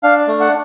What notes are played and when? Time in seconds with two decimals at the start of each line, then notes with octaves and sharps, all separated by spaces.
0.03 D4 F5
0.28 A3
0.41 F#5